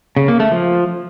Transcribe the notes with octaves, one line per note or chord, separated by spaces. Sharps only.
C#3
A#3
A3
F3